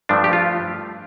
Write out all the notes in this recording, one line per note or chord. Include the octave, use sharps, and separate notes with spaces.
G2 F3 A3 D4
G4
F4